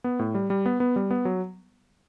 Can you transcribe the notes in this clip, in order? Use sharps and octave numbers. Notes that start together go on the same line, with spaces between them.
B3
A2
G3
G3
B3
B3
G3
B3
F#3